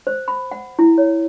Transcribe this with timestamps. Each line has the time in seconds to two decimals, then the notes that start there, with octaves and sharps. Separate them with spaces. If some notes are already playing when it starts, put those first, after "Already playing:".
0.07 C5
0.28 B5
0.52 F#5
0.79 E4
0.98 C#5